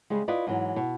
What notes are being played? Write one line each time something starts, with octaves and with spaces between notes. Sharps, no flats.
C#3 G3 G#3
E4 F4 B4 D5 D#5
G#2 E3 F#3
B2